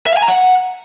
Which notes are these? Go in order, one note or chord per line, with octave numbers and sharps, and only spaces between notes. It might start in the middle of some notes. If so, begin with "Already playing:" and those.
E5
F5
G#5
A#5
F#5